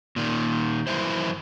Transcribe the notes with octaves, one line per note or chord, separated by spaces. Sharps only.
A#2 D#3
F#2 D#3 E3 E4 C5